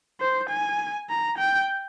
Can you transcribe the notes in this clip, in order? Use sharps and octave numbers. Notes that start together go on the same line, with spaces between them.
C5
G#5
A#5
G5